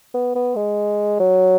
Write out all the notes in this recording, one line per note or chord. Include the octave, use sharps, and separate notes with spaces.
B3
B3
G#3
F#3